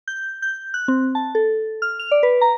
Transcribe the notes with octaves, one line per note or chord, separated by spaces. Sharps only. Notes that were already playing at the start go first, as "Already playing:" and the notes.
G6
G6
F#6
C4
A5
A4
F6
F7
D5
B4
A#5